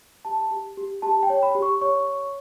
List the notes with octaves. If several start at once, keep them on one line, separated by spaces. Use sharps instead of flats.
G4 A5
G4
G4
G4 A5
G5
C#5
B5
G4
C#6
C#5 C#6
C#5